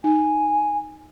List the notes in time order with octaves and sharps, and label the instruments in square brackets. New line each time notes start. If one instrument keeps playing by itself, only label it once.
[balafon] D#4 [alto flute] G#5